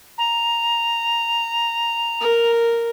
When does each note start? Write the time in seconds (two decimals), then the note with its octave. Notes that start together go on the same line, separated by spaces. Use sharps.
0.18 A#5
2.20 A#4